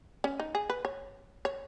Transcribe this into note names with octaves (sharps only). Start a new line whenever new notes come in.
C#4
D#4
G#4
B4
C#5
C#5